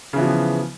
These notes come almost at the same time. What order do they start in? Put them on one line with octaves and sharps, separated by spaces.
C#3 E3 B3 F3